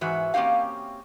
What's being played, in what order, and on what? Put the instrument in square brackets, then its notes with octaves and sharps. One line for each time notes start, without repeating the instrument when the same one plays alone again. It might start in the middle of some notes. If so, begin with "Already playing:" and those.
[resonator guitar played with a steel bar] G#2 E3 F#4 E5
A#3 C4 C#4 G4 F5